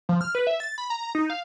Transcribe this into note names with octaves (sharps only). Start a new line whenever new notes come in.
F3
F6
B4
E5
A6
B5
A#5
D#4
F5